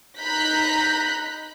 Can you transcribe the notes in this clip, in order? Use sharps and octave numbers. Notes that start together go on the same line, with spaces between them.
D#4 A#5 B5 F#6 G6 B6